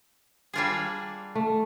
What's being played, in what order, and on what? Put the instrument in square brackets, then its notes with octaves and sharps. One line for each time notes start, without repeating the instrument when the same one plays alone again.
[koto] G3 A#3 D4 F4 G#4
[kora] A3